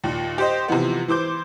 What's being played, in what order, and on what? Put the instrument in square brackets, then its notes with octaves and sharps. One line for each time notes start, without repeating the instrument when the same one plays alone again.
[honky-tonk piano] D#2 A#2
G4 C5 D#5
C3 E3 F3 B3
E3 C5 D6 G6